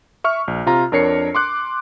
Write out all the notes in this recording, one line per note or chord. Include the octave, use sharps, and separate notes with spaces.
E5 C#6 F6
A#1
C3 F4 A#5
F2 D4 A#4 C#5 C7 C#7
C6 D6 F#6